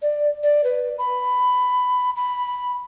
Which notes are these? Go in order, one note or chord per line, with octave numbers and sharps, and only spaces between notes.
D5
D5
B4
B5
B5